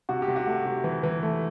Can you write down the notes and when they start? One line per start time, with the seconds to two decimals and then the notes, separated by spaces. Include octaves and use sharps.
0.09 C3 F#4
0.22 G4
0.28 C3
0.36 F#4
0.47 A3
0.66 C3
0.84 E3
1.03 E3
1.23 A3